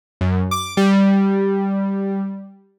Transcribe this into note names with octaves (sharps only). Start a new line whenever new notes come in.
F#2
D6
G3